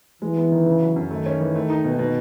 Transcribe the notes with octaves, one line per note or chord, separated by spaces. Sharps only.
E3 G#3
B3
D#3
C#3
F#3
F#2
D#3 A3
C#4
E3
A3
D#4
B2
B2